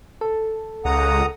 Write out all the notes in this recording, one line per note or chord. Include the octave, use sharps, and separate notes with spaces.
A4
C#2 F#5 A#5 D#6